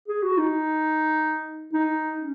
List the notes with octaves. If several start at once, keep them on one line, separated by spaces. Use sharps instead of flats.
G#4
F#4
D#4
D#4
C#4